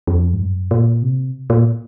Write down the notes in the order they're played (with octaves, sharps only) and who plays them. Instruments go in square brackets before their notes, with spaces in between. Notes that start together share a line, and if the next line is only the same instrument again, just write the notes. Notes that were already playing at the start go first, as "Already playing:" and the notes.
[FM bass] F2
G#2
F#2
A#2
C3
A#2